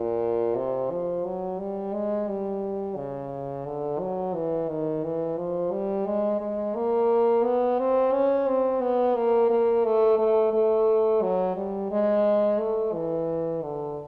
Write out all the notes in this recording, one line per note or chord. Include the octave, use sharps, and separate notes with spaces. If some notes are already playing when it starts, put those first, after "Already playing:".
Already playing: A#2
C3
F3
F#3
G3
G#3
G3
C#3
D3
F#3
E3
D#3
E3
F3
G3
G#3
G#3
A#3
B3
C4
C#4
C4
B3
A#3
A#3
A3
A3
A3
F#3
G3
G#3
A3
E3
D3